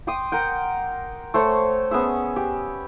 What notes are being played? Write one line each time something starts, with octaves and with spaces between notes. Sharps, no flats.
G5 C6 D6 D#6
A#4 F#5 G5
A3 C5 C#5
B3 C#4 G#4 E5
G4